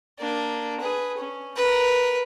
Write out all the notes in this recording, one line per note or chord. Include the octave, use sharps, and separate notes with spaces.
A#3 D4
G#4 B4
C#4
A#4 B4